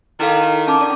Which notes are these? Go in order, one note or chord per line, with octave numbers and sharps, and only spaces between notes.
D#3 E4 A4 F5
C#4 A5 D6
D4 D5 D6